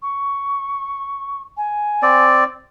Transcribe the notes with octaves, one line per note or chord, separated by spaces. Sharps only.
C#6
G#5
C4 D5